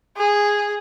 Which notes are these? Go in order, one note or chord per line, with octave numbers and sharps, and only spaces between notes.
G#4